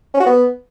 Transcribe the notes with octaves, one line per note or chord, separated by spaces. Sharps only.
C#4
F#4
B3